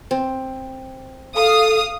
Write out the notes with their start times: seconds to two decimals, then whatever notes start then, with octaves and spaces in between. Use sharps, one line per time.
0.11 C4
1.36 A4 F5 D#6